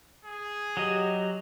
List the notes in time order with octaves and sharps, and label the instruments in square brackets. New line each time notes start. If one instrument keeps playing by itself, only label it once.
[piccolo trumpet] G#4
[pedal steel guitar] F#3 D#5 [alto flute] G4